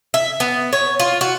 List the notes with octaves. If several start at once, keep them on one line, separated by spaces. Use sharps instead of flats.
E5
B3
C#5
F4
F#4